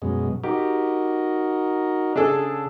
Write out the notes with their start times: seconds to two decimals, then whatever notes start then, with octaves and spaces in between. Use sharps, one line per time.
0.02 F#2 B2 G#3
0.43 D#4 F#4 G4 A#4
2.16 C#3 D4 G#4 A4